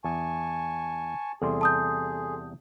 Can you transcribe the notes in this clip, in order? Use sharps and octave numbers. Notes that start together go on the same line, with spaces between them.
E2 G#5 A5 C#6
E2 C3 G3 G#4 A4 C6
A5 D#6 G6